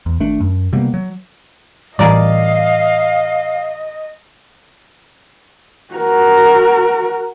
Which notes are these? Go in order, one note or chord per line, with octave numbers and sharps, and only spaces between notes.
E2
G#1 A3 D4
F#2
C3 G3 A#3 B3
F#3
A2 E3 G3 G#4 A#4 D5 D#5 F5
F#4 A#4